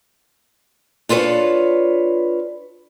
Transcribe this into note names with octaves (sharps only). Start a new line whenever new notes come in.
D4 F4 A4 B4 C#5